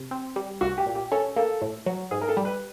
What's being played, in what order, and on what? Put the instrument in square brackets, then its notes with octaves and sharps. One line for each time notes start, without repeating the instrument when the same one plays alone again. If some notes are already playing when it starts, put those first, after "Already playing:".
Already playing: [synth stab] C3
C4
G3
[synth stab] C2 [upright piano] F#4
[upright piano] G4
[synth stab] A#2
[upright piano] G4
[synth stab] C#4 [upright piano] A4
[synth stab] A#3 [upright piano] A4
[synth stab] A2
F#3
[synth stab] G#2 [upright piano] G#4
[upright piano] A#4
A4
[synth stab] G3
[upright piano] B4